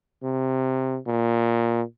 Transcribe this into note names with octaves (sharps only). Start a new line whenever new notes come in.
C3
A#2